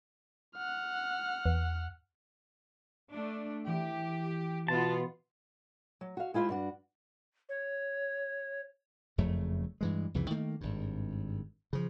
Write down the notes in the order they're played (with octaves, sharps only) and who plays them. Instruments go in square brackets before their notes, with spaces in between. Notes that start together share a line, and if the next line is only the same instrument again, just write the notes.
[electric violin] F#5 F6
[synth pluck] E2
[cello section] A3 D4
[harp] E3 [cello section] G4
[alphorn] B2 [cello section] B3 F4 [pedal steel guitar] A5
[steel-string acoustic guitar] F#3
F#4 F5
G#3 E4 F4 C5 E5
G2 D4 F#4
[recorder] C#5
[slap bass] F#1 F2 C#3 A3
G2 E3 G#3
C2 F2 C#3 E3
D#3 A3 A#3
G#1 G2
C#3 F3